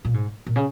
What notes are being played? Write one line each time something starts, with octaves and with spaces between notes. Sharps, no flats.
A#2
G#2
A#2
C#3